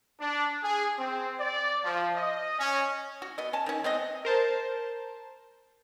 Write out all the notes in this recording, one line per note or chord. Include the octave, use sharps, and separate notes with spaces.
D4
G#4
C4
D5
F3
D#5
C#4
F#4
B3 D#5
C#4 G#5 A5
D#3 C#4
B3 C4 D#5
A#4 C5 A5